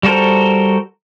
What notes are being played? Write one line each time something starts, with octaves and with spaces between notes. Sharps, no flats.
G3 F#4 A4 A#4 C5